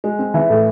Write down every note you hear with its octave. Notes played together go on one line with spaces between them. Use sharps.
G#3
C4
E3
A2